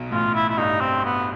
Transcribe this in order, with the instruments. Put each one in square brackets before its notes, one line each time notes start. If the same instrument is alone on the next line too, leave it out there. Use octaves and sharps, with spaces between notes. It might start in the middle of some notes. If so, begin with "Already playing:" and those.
Already playing: [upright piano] B1 B2
[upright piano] A1 A2 [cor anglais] F4
[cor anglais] E4
E4
[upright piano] G1 G2 [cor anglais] D#4
[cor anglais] C4
B3